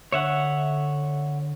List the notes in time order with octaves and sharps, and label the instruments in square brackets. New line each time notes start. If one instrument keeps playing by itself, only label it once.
[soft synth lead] D3 [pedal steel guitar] C#5 E5 F#5